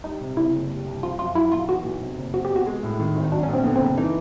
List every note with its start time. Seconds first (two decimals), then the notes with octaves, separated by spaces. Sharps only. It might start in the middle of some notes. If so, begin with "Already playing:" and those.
0.04 G3 D#4
0.21 C3
0.37 C#3 E4
0.53 F#1
0.70 G3
0.86 C2
1.03 F3 F4
1.18 F#2 F4
1.35 F#3 E4
1.52 B1 F4
1.69 E3 F#4
1.84 B1
2.01 C3
2.18 F#1
2.34 C4 F#4
2.45 G4
2.50 B2
2.56 F#4
2.66 G#3
2.83 A2
3.00 D#3
3.15 G#1
3.24 D#4
3.32 F#3 D4
3.43 C#4
3.49 A#1 C4
3.64 D3 B3
3.76 C4
3.81 F#1
3.97 E3 D#4